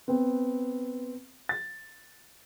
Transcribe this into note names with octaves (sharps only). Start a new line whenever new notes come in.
B3 C4
A6